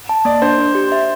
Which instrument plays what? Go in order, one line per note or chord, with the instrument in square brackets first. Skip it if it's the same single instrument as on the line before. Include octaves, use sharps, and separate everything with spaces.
[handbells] A5
[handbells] A#3 [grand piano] D5
[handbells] D4 [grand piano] C5
[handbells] D4
G4
E5